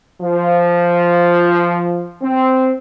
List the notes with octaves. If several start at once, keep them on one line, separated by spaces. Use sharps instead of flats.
F3
C4